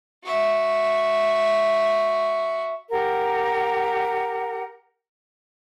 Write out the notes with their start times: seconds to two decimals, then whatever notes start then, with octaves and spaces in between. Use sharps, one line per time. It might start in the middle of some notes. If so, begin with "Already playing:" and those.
0.24 F#4 E5
2.90 G4 A#4 F#5